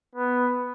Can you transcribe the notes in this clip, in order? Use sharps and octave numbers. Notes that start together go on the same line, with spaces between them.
B3